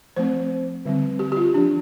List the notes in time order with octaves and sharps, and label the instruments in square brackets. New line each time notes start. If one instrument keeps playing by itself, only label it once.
[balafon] F3 A3 C4 C5
D3 G3 C4
G4
G4
F4
F3 D4